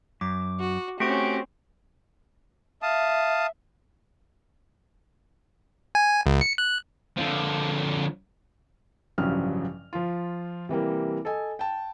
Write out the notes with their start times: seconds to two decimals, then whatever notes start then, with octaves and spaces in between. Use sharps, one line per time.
0.21 F#2 D6
0.60 F#4
1.00 A3 C4 C#4 F#4 G4 C#6 D7
2.82 E5 F5 A5 D#6
5.95 G#5
6.26 C#2
6.41 C#7
6.58 F#6
7.17 D3 F3
9.18 A1 G2 C#3 F3 F#3 F6
9.93 F3 F4
10.69 C3 E3 G3 A#3
11.25 A4 D#5 G#5
11.59 G5 A5